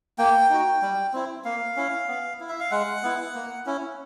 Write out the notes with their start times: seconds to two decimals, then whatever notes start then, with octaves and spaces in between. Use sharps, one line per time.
0.18 A#3 G5
0.50 D#4 F#4
0.82 G3
1.13 C4 E4
1.45 A#3 F5
1.76 C#4 E4
2.08 B3
2.40 E4
2.49 E5
2.60 F5
2.71 G#3 F#5
3.03 B3 E4
3.35 A#3
3.66 C#4 E4